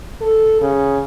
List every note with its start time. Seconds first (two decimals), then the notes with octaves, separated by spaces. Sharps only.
0.22 A4
0.61 C#3